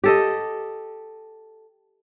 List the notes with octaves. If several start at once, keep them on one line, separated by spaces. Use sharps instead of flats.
G4 A4 D#5